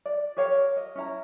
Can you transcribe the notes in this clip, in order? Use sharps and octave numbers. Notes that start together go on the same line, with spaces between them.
D5
G4 A#4 C#5 F5
D#5
C#4 E4 A#5